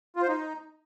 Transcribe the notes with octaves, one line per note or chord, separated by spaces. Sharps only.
F4
C5
D#4